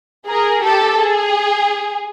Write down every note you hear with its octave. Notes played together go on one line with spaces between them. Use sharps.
G#4 A#4
G4 A4
G#4